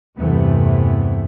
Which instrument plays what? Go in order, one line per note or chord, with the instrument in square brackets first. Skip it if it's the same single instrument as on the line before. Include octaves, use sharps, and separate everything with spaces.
[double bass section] E2 G2 C3 E3 A3 B3